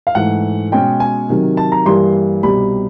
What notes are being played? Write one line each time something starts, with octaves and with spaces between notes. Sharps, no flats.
F5
G#2 E3 A3 F#5
B2 G#3 C#4 G5
G#5
C3 D#3 F#3
A5
A#5
G2 E3 G3 A#3 C6
C2 B2 G3 B5